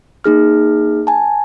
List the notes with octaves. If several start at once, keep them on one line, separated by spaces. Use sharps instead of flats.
A#3 D#4 G#4 F6
G#5 A5